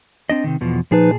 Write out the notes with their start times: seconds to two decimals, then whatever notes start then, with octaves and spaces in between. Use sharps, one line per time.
0.29 C4 D4 D#5
0.44 C3 D#3
0.61 E2 B2 F3
0.91 A#2 F3 D#4 G#4 B4 A5